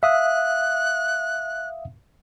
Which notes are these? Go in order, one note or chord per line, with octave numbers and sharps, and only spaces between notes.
E5 F5 D#6 F#6